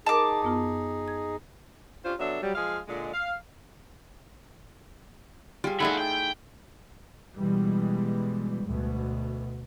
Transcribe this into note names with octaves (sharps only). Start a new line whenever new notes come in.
D#4 G#4 A#4 D#5 A5 D6
F#2 B3 F4
G#6
C#4 D4 F4 G4 C5
F#3 B3 D4 A4 E5
F#3 G3
F3 G#3 G#4 F5
A#2 D3 G#3
F5
G3 F4 G#4
A3 D#4 E4 G#4 E5 F#5
G5
B2 E3 G3 G#3
D2 B2